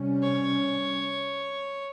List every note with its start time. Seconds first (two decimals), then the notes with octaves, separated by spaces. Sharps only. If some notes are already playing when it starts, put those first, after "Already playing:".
Already playing: C3 G3 C#4
0.23 C#5